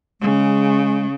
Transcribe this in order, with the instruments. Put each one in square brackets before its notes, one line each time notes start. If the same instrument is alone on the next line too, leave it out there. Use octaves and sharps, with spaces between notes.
[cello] C#3 [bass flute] G#3